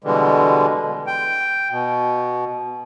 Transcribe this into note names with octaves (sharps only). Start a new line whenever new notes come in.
B2 D3 E3 G3 G#3
G5
B2